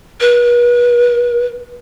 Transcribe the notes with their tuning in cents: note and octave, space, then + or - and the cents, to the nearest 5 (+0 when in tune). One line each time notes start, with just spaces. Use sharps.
B4 -40